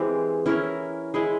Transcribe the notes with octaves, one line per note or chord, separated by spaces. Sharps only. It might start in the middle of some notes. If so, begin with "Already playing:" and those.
Already playing: E3 G#3 C4 G4
C#4 E4 A#4
G#3 E4 G#4